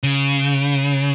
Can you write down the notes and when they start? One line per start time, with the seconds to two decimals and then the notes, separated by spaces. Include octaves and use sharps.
0.03 C#3